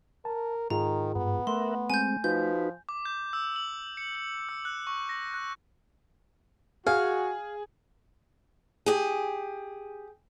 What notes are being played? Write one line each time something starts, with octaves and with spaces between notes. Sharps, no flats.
A#4 A5
G#2 D#3 F4 G#4 A#5
G2 B3
A3 A#4 E5 F#5 C6
G#3 C4 G#5 G6
F3 D#4 F#4 B4 G6
D6
G6
E6
F#7
C#7
F#7
E6
F#6
C#6
A#6
F#6
F#4 G#4 F5
G4 G#4